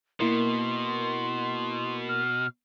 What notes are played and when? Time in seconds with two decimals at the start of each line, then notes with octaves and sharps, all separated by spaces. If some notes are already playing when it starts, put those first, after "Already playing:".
0.20 B2 A#3 E4 A#4 C6
2.09 F6